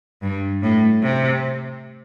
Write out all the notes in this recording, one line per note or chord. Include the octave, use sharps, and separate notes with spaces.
G2
A2
C3